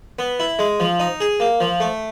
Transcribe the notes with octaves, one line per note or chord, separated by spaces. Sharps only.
B3
E4
G#3
F3
D#4
G#4
A#3
F3
A3